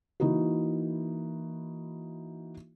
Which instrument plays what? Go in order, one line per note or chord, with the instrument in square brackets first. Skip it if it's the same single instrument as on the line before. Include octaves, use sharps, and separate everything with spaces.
[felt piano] E3 A#3 D#4 E4 F#4